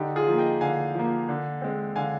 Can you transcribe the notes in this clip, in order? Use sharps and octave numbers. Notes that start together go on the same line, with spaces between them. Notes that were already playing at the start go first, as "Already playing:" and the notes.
Already playing: D3 D#4 G4
F4 G#4
F3 A#3
D#5 G5
D3 F5 G#5
F3 A#3
D3
G#3 C4
D3 F5 G#5